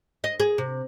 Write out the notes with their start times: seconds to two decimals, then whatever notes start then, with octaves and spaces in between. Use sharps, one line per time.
0.24 D#5
0.40 G#4
0.58 C3